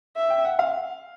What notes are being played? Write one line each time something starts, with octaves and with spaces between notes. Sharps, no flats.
E5
G5
F#5
F5